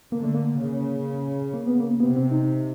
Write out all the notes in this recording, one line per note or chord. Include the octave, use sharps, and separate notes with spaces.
D3 A#3
A3
A#3
C#3
A#3
B3
A#3
C3 B3
C4
D#4